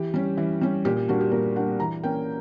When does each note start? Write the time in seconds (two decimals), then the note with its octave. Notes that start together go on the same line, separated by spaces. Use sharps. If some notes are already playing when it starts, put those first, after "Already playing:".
Already playing: E3 G4
0.14 G3 C#4
0.37 E3
0.61 G3 C#4
0.85 A#2 G4
0.97 G4
1.08 G3 A#3 D4 F#4
1.20 G4
1.31 A#2 A#4
1.56 G3 A#3 D4 F#5
1.80 E3 A#5
2.04 A#3 C#4 G5